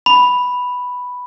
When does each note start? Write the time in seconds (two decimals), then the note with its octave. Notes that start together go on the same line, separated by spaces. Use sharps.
0.06 B5